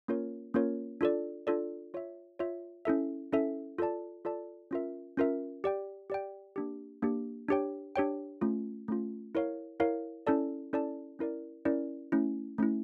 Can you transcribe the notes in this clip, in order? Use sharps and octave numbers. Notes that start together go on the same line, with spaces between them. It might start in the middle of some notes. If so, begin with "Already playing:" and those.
A#3 C#4 F4 A#4 C#5
A#3 C#4 F4 A#4 C#5
D4 F4 A4 D5
D4 F4 A4 D5
F4 C#5 E5
F4 C#5 E5
C#4 E4 A4 E5
C#4 E4 A4 E5
F4 A4 D5 A5
F4 A4 D5 A5
C#4 F4 A#4 E5
C#4 F4 A#4 E5
G4 D5 G5
G4 D5 G5
A#3 D4 G4
A#3 D4 G4
D4 G4 C#5 G5
D4 G4 C#5 G5
A3 C#4 F4
A3 C#4 F4
E4 A#4 C#5 F5
E4 A#4 C#5 F5
C#4 E4 A4 D5 A5
C#4 E4 A4 D5 A5
C#4 E4 A#4 D5
C#4 E4 A#4 D5
A3 C#4 E4
A3 C#4 E4